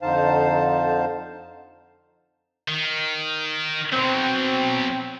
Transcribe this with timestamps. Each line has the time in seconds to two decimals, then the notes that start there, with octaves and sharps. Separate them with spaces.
0.02 F2 D3 D#4 C5 F5 A5
2.68 D#3
3.92 B2 F#3 C4